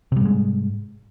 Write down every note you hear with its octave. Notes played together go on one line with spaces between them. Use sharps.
G#2 C3 G3 G#3